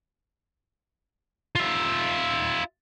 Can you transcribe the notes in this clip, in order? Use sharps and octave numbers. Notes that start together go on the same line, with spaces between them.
F4 E5